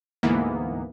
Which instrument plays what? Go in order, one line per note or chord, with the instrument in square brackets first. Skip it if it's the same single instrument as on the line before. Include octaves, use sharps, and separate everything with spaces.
[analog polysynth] D2 G#2 E3 A#3 B3